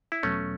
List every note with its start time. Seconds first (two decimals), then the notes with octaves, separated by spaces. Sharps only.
0.12 E4
0.23 E2 B2 F#3 A3 B3 C#4